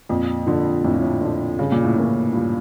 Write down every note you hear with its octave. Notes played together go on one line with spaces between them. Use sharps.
F2 A#2
D3 F3
F2 A2
A#2
A2
D3 F3
G2 C#3
A#2
A2
A#2 E3 A#3 C#4
G2 A#2